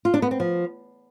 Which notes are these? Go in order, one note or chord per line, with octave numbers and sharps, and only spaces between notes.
F4
D4
B3
C4
F3